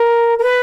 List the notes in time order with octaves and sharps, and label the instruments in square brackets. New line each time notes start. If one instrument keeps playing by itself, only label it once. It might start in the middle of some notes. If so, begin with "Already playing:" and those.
Already playing: [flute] A#4
A#4
B4